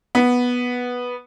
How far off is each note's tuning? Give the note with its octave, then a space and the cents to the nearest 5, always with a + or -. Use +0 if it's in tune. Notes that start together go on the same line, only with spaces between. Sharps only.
B3 -5